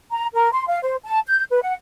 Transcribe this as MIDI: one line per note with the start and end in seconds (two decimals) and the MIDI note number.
0.11 0.25 82
0.34 0.50 70
0.52 0.65 84
0.68 0.79 77
0.82 0.95 72
1.04 1.19 81
1.27 1.43 91
1.50 1.62 71
1.63 1.73 78